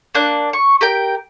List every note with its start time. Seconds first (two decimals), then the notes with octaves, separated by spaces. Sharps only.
0.15 A#3 D4 F#6
0.53 C#6
0.81 G4 A#4 G5